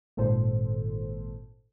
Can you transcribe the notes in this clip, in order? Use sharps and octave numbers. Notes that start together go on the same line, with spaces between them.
G#1 A#2 A4 C5